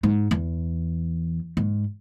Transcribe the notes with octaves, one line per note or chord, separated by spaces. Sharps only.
G#2
E2
G#2